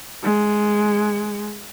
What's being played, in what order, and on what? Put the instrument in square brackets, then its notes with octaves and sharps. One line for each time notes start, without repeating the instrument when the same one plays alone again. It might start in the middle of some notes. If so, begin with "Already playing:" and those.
[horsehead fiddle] G#3